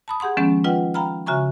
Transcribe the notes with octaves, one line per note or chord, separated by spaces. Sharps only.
A5 B5 D#6
G4 G#4 F#5 C6 D#6
D#3 F3 G#3 B3 C#4
D#4 F4 B4 D#5 F#5 G5
F5 G5 A#5 B5 F6
C#3 F#4 E5 G#5 A#5 C#6